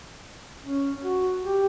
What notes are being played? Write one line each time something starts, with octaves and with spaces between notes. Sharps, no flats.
C#4
F#4
G4